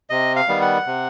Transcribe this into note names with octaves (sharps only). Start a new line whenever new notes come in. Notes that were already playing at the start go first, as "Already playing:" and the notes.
C3 D#5
F5
D#3 G3 B3
F#5
C3